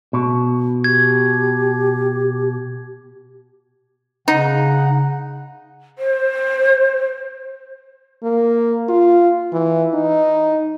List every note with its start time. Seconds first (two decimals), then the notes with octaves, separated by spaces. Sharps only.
0.13 B2
0.84 G4 G#6
4.28 C#3 D#4 F#5
5.98 C5
8.23 A#3
8.89 F4
9.53 E3
9.94 D#4